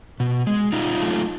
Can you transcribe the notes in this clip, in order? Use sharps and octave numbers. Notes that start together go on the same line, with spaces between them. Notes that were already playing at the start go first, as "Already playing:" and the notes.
B2
G#3
B2 D#4 F4
F#3 A3